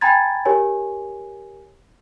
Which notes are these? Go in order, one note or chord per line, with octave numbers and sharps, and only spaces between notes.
G5 G#5 A#5 B5 G#6 A6
G4 A#4 C#5 G#5